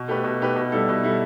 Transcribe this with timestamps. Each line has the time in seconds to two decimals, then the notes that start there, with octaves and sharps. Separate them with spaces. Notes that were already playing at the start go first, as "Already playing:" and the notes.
Already playing: B2
0.08 A3 G4 B4
0.24 B2
0.40 A3 G4 B4
0.56 B2
0.72 G3 E4 A4
0.89 B2
1.03 G3 E4 A4